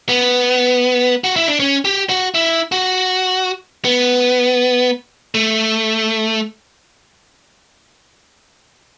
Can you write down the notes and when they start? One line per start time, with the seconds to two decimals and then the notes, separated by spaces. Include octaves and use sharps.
0.09 B3
1.24 F#4
1.36 E4
1.48 D4
1.60 C#4
1.85 G4
2.09 F#4
2.34 E4
2.72 F#4
3.85 B3
5.35 A3